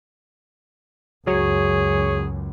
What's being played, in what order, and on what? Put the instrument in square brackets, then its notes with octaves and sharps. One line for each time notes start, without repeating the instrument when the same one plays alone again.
[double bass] C#2 F#2 [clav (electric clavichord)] F#3 [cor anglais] G#4 [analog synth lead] C#5